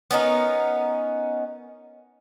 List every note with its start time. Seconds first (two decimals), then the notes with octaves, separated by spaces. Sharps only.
0.11 B3 C#4 D#4 A#4